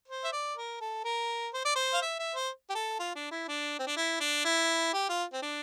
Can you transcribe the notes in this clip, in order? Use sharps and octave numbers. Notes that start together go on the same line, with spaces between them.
C5
E5
D5
A#4
A4
A#4
C5
D5
C5
F5
E5
E5
C5
G4
A4
F4
D4
E4
D4
C4
D4
E4
D4
E4
G4
F4
C4
D4